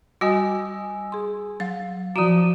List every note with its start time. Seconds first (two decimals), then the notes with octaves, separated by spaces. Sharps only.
0.21 G3 F#4 D#5 G#5 D#6 E6
1.12 G#4 C6
1.60 F#3 F5
2.16 F3 F#4 D5 A#5 D#6 D#7 E7